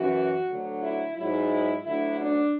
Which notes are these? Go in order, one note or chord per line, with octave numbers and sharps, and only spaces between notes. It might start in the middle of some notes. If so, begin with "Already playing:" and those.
Already playing: F#2 E3 F#4
D2 D3 F#3
E4
G#2 F#3 E4
D2 D3 F#3 E4
D4